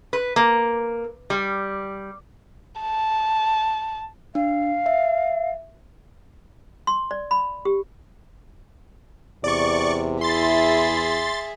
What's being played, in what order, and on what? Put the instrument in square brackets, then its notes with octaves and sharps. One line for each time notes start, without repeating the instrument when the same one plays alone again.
[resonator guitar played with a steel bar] B4
A#3
G3
[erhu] A5
[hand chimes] D4 [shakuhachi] F5
[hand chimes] E5
[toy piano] C6
D5
B5
G4
[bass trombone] E2 [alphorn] C3 [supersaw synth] D5 C#6
[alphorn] E4 [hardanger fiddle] G#4 E5 [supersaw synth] C6 A6